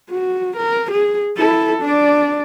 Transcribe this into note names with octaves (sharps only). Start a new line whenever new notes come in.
F#4
A#4
G#4
E4 A4
D4 D5